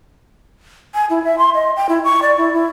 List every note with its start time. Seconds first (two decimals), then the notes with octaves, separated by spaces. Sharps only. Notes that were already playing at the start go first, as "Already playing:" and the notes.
0.95 G#5
1.10 E4
1.24 E5
1.38 C6
1.54 D#5
1.76 G5
1.89 E4
2.04 C#6
2.22 D5
2.37 E4
2.54 E4